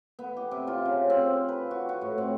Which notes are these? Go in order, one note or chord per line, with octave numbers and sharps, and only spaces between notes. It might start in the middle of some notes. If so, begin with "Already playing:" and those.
B3
G4
C3
F4
C#3
C4
B4
F#4
F#4
A2
C4